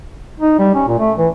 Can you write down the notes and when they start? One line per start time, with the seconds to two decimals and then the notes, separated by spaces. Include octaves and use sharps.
0.40 D#4
0.59 G3
0.75 C#4
0.88 A#2
0.99 A3
1.18 E3